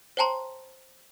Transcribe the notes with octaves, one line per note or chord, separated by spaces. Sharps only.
C5 C#5 G5 A5 A#5 C6